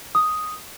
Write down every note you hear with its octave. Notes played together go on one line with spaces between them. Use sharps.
D#6